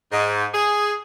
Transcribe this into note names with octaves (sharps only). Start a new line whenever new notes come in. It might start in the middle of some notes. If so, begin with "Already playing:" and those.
G#2
G#4